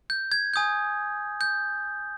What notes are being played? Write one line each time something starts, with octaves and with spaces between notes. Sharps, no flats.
G6
G#6
G#5 D#6 G6
G6